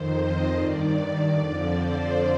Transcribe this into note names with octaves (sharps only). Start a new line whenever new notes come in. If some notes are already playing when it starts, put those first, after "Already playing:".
Already playing: F2 D#3 C5
D#5
G2 D#3 D5
F2 D3 F3
C5